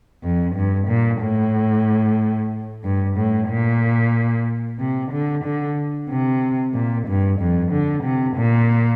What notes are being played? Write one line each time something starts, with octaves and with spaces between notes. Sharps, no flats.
F2
G2
A#2
A2
G2
A2
A#2
C3
D3
D3
C3
A#2
G2
F2
D3
C3
A#2